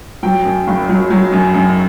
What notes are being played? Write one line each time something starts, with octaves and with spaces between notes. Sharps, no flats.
F#3 G5
F#2
F#1
F#3
F#3
F#2
F#2